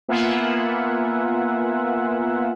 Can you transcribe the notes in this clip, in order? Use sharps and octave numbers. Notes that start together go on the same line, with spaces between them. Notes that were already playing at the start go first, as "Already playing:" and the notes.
A#3 B3 F4 E5 F#5 G#5